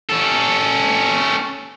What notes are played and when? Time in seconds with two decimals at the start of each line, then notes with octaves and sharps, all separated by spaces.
0.10 C#4 A4